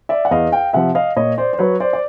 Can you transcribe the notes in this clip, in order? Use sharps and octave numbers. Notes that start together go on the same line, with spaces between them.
D5 E5
F#5
E2 D#5 F5
F5 G5
C3 F3 E5 F#5
D#5 F5
A#2 C#5 D#5
C5 D5
C5
F#3 B4 C#5
C5 D5
D5